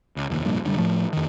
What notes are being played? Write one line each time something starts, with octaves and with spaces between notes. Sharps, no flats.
C#2
F1 D#2
F1 A#1 G2 A#2
F1 D3 G3
A2 F3 A3
F2 D#3